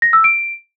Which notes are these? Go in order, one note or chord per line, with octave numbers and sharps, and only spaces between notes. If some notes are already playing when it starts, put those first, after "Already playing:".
A#6
E6
D7